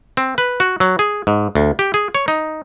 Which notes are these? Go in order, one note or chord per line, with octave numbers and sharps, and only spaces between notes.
C4
B4
F#4
F#3
G#4
G#2
D2
G4
G#4
C#5
D#4